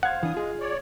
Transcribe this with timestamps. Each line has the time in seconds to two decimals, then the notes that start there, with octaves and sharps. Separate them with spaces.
0.03 C5 F5 F#5 G#6
0.23 E3 D4 D#6
0.34 G#3 F4 G#4
0.60 C#5 D5